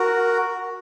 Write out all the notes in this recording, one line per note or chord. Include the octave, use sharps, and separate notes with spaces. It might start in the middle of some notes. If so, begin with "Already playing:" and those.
Already playing: F#4 A#4